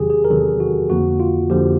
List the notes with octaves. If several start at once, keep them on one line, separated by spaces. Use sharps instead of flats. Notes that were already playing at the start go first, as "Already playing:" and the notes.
Already playing: E2 C3 D#3 F#3 G4 G#4
G#4
A#4
E2 C3 D#3 F#3 A4
F#4
F2 D3 F3 A#3 F#4
F4
F2 D3 F3 A#3 G4